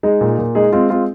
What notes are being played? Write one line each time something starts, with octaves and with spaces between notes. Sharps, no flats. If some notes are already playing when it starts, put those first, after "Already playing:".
G#3 D#4 G#4
A#2
A#2
G#3 D#4 G#4
G#3 C4 F4
G#3 C4 F4